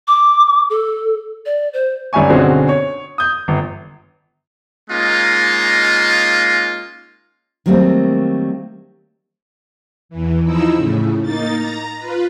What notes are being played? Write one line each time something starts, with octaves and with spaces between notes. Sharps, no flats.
D6
A4
D5
C5
G1 G3 C#4 E5 G#5 C#6
B1 D3 C4 C#4 F#4 G#4
C#5
D#6 G6
G1
G#3 A#3 C#4 D#4 F4
D#3 F#3 G3 A3 A#3 C4
E2 E3
F3 D#4 E4 E5
A2 C#3
A#3 D#4 A6
A#5
F4 B4